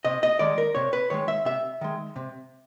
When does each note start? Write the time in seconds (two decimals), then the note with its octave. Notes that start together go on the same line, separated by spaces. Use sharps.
0.05 C3 D#5
0.23 D#5
0.39 D#3 G#3 D5
0.58 A#4
0.75 C3 C#5
0.93 B4
1.10 D#3 G#3 C#5
1.28 E5
1.45 C3 E5
1.81 D#3 G#3
2.16 C3